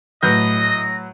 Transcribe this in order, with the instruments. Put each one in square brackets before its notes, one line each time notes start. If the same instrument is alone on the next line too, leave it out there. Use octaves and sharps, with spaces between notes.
[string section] A2 [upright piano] F#3 B4 G6 [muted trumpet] D#5 [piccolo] A#6